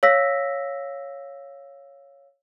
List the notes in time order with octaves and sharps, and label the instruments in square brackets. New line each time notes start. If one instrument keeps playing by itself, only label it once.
[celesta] C#5 F5 E6 A#6 B6